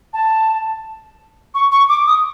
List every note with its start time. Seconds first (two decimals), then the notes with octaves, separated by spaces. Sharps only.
0.13 A5
1.55 C#6
1.72 C#6
1.89 D6
2.07 D#6